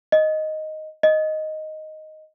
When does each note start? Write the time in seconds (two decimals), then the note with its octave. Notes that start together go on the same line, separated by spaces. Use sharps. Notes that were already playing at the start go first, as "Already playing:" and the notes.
0.12 D#5
1.03 D#5